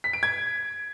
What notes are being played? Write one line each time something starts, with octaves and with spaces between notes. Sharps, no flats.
B6
D7
G#6